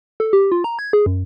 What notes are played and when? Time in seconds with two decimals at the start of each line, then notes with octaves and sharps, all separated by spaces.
0.20 A4
0.33 G4
0.52 F4
0.64 A#5
0.79 G#6
0.93 G#4
1.06 F#2